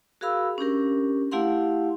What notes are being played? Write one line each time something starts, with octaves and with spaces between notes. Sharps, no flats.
F#4 G#4 A#4 F5 B5 E6
C#4 D4 G4 A#4
A3 E4 G4 F5 F#5 C6